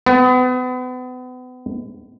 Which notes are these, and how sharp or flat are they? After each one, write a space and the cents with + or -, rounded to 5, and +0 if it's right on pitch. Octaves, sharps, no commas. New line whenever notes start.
B3 +35